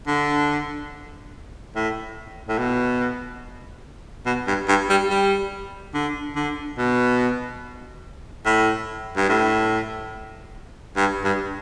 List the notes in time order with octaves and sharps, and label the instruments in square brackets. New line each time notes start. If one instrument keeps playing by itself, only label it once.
[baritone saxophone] D3
A2
A2
B2
B2
G2
G2
G3
G3
D3
D3
B2
A2
G2
A2
G2
G2